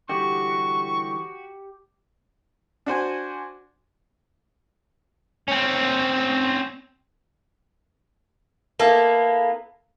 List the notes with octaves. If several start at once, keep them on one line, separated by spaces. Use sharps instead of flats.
D3 E3 G3 F#4 G4 C#6
D4 F#4 C5 G#5
C4 C#4
A#3 B3 E4 A4